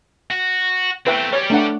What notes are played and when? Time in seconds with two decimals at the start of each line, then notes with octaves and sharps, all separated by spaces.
0.31 F#4
1.07 A3 C4 B4 E5 G5
1.33 G3 G4 C#5
1.50 A3 D4 F#5